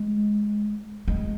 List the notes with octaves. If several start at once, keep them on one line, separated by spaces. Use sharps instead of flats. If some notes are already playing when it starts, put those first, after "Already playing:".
Already playing: G#3
G#3